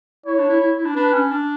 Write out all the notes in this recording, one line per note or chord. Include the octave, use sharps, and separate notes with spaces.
E4 C#5
D4
E4
E4
E4
D4
D4 B4
C#4
D4